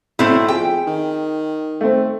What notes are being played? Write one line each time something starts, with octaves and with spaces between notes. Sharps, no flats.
B1 A3 C4 E4
F2 G#4 G5
D#3
A3 C4